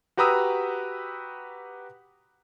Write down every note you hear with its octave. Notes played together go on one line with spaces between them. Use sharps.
F#4 G4 B4 A#5 D#6 E6